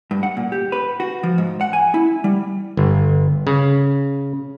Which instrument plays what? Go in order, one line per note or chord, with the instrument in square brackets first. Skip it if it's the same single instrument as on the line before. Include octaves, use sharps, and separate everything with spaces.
[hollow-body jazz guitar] G2
F#5
A#2
G4
B4
F#4
F3
G#2
F#5
G#5
E4
G3
[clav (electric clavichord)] G1
C#3